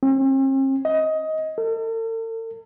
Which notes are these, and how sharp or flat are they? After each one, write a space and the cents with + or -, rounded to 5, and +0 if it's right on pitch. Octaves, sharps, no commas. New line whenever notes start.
C4 +45
D#5 +15
A4 +45